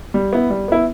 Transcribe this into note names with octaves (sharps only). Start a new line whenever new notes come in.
G3
B3 E4
G3
B3 E4